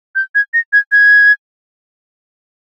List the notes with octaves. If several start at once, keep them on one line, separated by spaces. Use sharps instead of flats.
G6
G#6
A#6
G#6
G#6